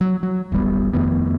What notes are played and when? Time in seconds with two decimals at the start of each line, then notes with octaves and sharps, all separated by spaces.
0.01 F#3
0.23 F#3
0.52 D#1 G#1 G3 B3
0.93 F2 D#3 A3 B3